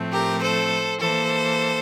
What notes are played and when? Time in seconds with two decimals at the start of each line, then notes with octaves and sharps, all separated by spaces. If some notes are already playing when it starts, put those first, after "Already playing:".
Already playing: A2 F3 A3 C4
0.11 G4 A#4
0.41 A4 C5
0.99 E3 A#3 A4 C5